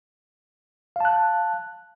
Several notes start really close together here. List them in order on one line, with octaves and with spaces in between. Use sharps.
F5 A5 F#6